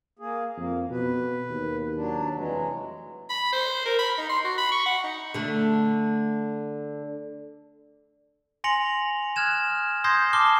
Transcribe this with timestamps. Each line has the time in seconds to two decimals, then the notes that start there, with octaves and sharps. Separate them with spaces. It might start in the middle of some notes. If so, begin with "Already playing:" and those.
0.19 A#3 G#4
0.57 F2 A#3
0.90 B2 B4
1.50 D#2
1.96 F#3 D4
2.34 F1 E3 F#3 G#3
3.30 B5
3.53 C5
3.86 A#4
3.99 B5
4.18 D#4
4.29 C6
4.44 F#4
4.58 B5
4.72 C#6
4.86 F#5
5.04 D#4
5.34 D3 A3
8.64 G#5 C6 A#6 C#7 F7 F#7
9.36 D#6 F6 F#6 G#6 E7
10.04 C6 D#6 G6 G#6 A#6 C7
10.33 A5 D6 F6 C7 G7